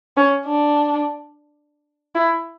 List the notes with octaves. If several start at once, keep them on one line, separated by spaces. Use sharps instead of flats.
C#4
D4
E4